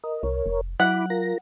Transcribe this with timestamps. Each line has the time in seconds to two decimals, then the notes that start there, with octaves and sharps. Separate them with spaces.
0.04 A#4 D#5
0.23 C2 A#4 C#5
0.46 F1
0.80 F#3 E4 F#5 B5 D6
1.10 F4 A#4 A#6